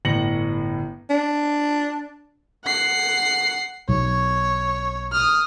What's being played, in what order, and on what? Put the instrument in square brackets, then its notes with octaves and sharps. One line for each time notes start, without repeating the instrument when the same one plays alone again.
[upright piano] G1 A2 A#6 C#7 F#7
[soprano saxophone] D4
[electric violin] F#5 C7
[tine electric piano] B1 [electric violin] C#5
[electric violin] D#6 F6